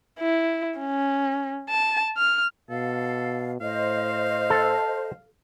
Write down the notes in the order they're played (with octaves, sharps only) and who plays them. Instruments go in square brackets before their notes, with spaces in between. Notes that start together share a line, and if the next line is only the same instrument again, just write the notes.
[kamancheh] E4
C#4
A5
F6
[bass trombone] B2 [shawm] A4 [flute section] F5
[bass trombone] A2 [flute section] C5 D#5 [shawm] F5
[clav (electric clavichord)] A4